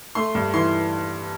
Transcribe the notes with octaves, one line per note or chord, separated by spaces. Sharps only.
A3 C6
G2
E3 C6